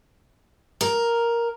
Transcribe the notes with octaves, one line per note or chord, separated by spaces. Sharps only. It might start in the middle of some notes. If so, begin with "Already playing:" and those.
A#4